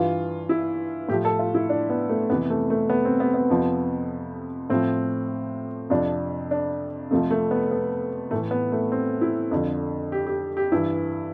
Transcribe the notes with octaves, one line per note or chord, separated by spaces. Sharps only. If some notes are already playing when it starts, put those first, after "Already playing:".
Already playing: G2 E3 F4
E4
A2 F3 G4
A4
F4
E4
D4
B3
A3
F2 C3 E3 B3
A3
A3
B3
C4
B3
B3
F2 C3 F3
A2 F3 C4
F2 C3 F3 D4
D4
F2 C3 F3 A3
A3
B3
B3
A2 E3 A3
B3
A3
C4
E4
F2 D3 F3
G4
G4
G4
G2 E3 E4